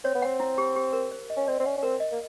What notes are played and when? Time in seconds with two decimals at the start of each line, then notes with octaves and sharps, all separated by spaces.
0.04 C4 C#5
0.15 B3
0.22 C4 F#5
0.40 E4
0.58 G4
0.76 G4
0.93 A#4
1.11 C5
1.30 D#5
1.37 C#4
1.48 C4 D5
1.60 C4
1.65 C#4 F#5
1.77 C#4
1.83 C4 A#4
2.00 D#5
2.12 A#3